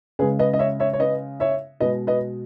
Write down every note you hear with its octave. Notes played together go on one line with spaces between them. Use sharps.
C#3 G#3 G#4 B4
B4 D#5
D#5
C#5 E5
C#5 E5
C#5
B4 D#5
C#5 E5
B2 G#3 B4 D#5
B4 D#5